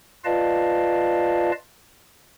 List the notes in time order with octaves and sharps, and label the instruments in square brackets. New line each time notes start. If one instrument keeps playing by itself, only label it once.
[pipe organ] F4 B4 D5 D#5 F5 A5